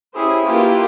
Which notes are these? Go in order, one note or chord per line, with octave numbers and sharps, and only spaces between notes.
C#4 E4 G4 G#4 C5
A#3 E4 F4 G4 B4